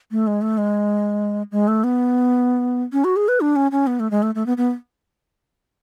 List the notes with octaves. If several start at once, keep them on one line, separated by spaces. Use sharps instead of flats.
A3
G#3
A3
G#3
G#3
A3
B3
C#4
F#4
G#4
B4
D4
C#4
C#4
B3
A3
G#3
A3
A3
B3
B3